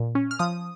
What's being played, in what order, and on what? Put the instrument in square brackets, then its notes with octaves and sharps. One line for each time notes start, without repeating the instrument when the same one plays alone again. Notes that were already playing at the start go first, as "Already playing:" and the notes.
Already playing: [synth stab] A#2
C#4
F6
F3 D#6